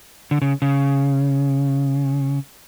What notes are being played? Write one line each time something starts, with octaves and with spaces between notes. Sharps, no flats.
D3
C#3
C#3